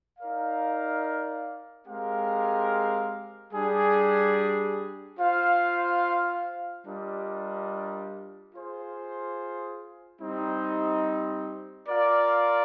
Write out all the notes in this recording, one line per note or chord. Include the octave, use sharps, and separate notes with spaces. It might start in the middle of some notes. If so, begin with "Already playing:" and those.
D#4 A#4 D5 F5
G#3 C4 G4 A#4 F5
G3 D4 G#4
F4 C5 F5
G3 D4 F4 A#4 D#5
F4 G#4 C5
G3 C4 D#4
F4 A#4 D5 F5